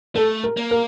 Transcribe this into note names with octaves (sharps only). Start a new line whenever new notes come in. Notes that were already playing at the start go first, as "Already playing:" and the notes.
A3 A4
A#4
A#3
A#4